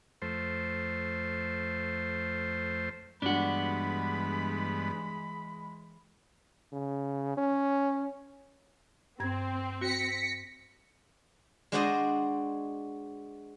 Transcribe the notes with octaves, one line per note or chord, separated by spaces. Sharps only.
F2 A3 C5
G2 E3 G#3 B3 D4 F#4 B5
C#3
C#4
G2 C4 G#6
F#4 A#6 B6 C#7
G#3 D4 F#4 C5 D5 D#5